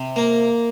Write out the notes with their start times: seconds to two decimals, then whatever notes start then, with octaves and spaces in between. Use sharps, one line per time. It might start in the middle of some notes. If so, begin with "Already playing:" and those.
Already playing: C3
0.16 A#3